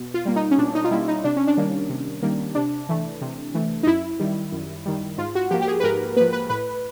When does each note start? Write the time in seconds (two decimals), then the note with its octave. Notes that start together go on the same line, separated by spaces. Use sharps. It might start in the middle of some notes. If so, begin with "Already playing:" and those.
Already playing: B2
0.14 F4
0.25 G3 A#3
0.36 D#4
0.51 C#4
0.58 B2 D4
0.75 D#4
0.84 F4
0.91 G3 A#3 E4
1.08 D#4
1.24 C3 D4
1.37 C#4
1.47 D4
1.57 D#3 G3 A#3
1.90 C3
2.22 D#3 G3 A#3
2.55 C3 D4
2.89 E3 A3
3.21 C3
3.54 E3 A3
3.83 D#4
3.87 F#2 E4
4.20 D#3 G3
4.52 F#2
4.86 D#3 G3
5.18 G#2 F4
5.35 F#4
5.51 F3 A#3 G4
5.62 G4
5.68 G#4
5.80 B4
5.84 G#2 A#4
6.16 F3 A#3 B4
6.33 B4
6.50 A2 B4